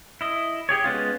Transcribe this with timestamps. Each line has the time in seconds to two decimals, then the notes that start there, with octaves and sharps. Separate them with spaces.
0.21 E4 D#5
0.69 G4 G#4 C#5
0.84 G#3 B3 C#4 F4